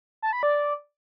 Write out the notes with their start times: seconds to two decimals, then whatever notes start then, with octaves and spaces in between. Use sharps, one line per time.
0.22 A5
0.33 B5
0.43 D5